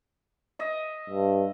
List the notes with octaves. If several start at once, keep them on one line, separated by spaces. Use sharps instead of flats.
D#5 E5
G2